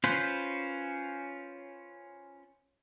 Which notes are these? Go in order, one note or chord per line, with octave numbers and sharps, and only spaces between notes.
C#4 F4 B4 C5